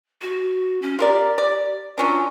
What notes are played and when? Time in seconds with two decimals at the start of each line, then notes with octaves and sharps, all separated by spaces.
0.21 F#4
0.82 C#4
0.99 F4 G4 A#4 D5
1.38 D5
1.98 F#3 C#4 D4 F4